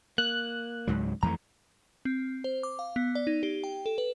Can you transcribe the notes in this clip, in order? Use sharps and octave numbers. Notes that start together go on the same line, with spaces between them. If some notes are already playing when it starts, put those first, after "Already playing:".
A#3 F#6
C#2 G#2 F#3
F2 E3 A3 A#5
C4
C5
D6
F5
B3
D5
D#4
G4
G5
A4
B4